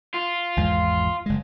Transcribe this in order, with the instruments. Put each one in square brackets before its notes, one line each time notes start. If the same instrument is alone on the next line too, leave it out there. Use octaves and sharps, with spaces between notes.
[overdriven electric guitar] F4
[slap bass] G#1 E2 G#3
F#1 G#3